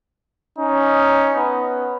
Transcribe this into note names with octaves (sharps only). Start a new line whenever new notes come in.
C#4 D#4
B3